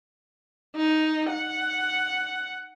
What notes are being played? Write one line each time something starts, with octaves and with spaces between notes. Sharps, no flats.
D#4
F#5